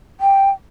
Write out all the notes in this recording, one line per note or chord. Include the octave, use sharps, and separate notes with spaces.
G5